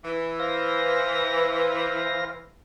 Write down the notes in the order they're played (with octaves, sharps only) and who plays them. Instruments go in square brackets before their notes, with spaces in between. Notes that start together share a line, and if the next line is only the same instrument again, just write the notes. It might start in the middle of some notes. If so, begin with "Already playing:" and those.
[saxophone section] E3
[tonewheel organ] C5 F5 A#6